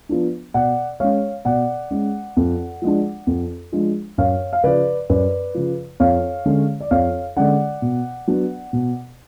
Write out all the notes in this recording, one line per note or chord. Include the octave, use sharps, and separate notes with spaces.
F3 B3 D4
B2 D5 F#5
G#3 C#4 C#5 F5
B2 D5 F#5
G#3 C#4
F2
F3 G#3 D4
F2
F3 G#3 D4
F#2 C#5 F5
F5
C#3 F3 B4 D5
F#2 B4 D5
C#3 F3
F2 C#5 F5
D3 G#3 C#4
D5
F2 C#5 F5
D3 G#3 C#4 D5 F#5
B2
F#3 B3 D4
B2